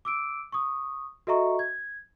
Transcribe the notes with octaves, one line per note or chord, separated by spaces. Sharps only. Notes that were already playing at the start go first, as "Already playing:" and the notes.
D6 E6 D7
C#6 D#6
F#4 A4 D#5 E5 A#5 C#6
G#6